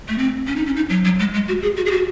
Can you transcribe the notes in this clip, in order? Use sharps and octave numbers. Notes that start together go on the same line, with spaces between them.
A3
C4
C#4
D#4
C#4
D#4
F#3
F#3
G#3
G#3
F#4
G#4
F#4
G#4
F#4